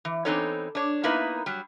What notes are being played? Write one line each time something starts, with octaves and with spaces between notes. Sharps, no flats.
E3
E3 B3 C4 D#4 A4 C#5
D4 C#5
A#3 B3 D#4 E4 A#4 B4
F#3 G3